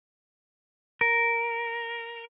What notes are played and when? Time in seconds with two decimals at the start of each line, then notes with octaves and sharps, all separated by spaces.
1.01 A#4